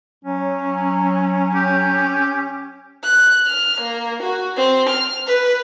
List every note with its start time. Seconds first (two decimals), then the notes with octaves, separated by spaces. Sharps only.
0.25 F#3 C#4
1.55 G4
3.04 F#6
3.47 F6
3.81 A#3
4.23 F#4
4.57 C4
4.89 F6
5.27 B4